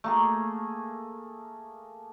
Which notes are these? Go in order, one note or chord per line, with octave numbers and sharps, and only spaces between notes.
A3 A#3 G#4